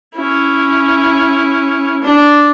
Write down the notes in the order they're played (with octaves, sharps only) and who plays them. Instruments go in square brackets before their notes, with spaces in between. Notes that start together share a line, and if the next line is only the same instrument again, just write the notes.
[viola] C#4 E4
D4